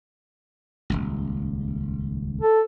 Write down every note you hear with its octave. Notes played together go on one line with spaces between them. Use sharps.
D#1 G#1 C#2
A4